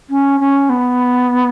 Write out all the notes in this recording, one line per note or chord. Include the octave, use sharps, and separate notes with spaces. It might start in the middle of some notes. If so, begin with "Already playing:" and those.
C#4
C#4
B3